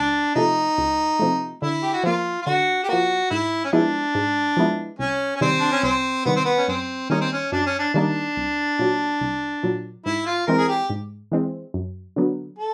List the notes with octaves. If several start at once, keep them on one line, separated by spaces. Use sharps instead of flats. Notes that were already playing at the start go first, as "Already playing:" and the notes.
Already playing: C#2 D4
C3 F3 A3 D#4
C#2
C3 F3 A3
D3 E4
G4
F#4
F3 A#3 F4
F4
D3 F#4
G4
F3 A#3 F#4
G#2 E4
C#4
F3 G#3 B3 D4 E4
G#2
F3 G#3 B3 E4
C2 C#4
C#4
C3 D#3 G3 C4
D4
C#4
C2 C4
C3 D#3 G3 B3
C4
B3
C#4
F#2 C4
D#3 G3 A#3 C#4 D#4
C4
C#4
F#2 D4
C#4
D4
D#3 G3 A#3 D4 D#4
C2
A#2 F#3
C2
A#2 F#3
G#2 E4
F4
E3 G#3 C4 A#4
G#4
G4
G#2
E3 G#3 C4
F#2
D3 F#3 B3
A4